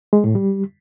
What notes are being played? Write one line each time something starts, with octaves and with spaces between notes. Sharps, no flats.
G#3
A2
G3